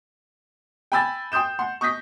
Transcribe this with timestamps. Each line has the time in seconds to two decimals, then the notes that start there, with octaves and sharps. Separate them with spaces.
0.92 G5 G#5 B5 E6 A6
1.32 G5 C6 D#6 G6 E7
1.59 F#5 C6
1.81 C#6 D#6 G6 A#6 B6